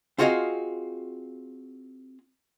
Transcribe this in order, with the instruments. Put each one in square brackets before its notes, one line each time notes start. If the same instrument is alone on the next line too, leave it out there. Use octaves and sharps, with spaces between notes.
[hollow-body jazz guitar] C4 F4 F#4 G#4 D#5 F5